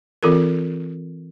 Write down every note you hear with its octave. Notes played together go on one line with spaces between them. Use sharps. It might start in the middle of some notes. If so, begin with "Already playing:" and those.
E3 C4 F4 A4 A#4